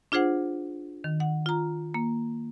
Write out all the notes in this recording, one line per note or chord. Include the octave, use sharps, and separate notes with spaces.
D4 F4 G#4 C5 F#5
D#3
F#5
F4 A#5
A#3